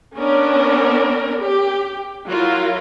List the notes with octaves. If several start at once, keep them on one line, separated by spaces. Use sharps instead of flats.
B3 C#4 D4 A#4
G4
F#3 E4 F4 A#4